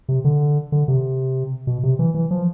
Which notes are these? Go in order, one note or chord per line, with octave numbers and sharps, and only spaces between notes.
C3
D3
D3
C3
B2
C3
E3
E3
F3